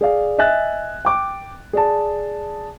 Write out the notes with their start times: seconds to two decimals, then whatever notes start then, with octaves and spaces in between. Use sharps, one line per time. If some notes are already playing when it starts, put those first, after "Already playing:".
0.01 G#4 D5 F5
0.38 D#5 E5 G#5 F#6 A6
1.05 G5 D6
1.73 G#4 D5 A5